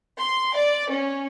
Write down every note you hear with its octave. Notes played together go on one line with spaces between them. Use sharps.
C6
D5
C#4